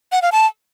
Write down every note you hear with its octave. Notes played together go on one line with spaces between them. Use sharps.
F#5
F5
A5